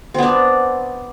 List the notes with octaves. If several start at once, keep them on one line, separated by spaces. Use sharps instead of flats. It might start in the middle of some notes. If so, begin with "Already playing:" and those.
B3 C4 D4